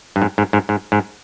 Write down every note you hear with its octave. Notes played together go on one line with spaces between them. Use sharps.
G2
G#2
G#2
G#2
G#2
G#2